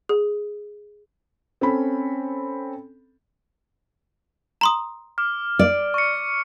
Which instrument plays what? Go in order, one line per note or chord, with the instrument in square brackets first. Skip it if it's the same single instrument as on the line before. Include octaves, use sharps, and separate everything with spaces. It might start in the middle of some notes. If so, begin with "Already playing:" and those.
[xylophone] G#4
[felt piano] C4 C#4 A4 B5
[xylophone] A#5 C6 D#6
[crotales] D6 F6
[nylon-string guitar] D5
[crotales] C#6 C#7